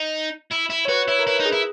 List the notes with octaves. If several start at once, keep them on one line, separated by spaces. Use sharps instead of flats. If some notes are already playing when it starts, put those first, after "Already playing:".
Already playing: D#4
E4
E4
C#5
F#4 B4
E4 C#5
A#4
E4 B4
D#4
G#4
E4